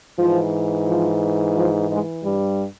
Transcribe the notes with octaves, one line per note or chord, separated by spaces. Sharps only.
G#2 E3 F3
F3
F3
G#2 G#3
G2 G3